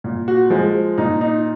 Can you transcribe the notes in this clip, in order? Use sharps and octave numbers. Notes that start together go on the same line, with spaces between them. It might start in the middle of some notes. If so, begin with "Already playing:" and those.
A#2
F#4
F3 G#3
A#2 D#4
D#4